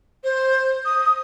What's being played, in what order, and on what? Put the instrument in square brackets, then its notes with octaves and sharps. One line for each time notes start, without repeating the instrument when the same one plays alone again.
[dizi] C5
D#6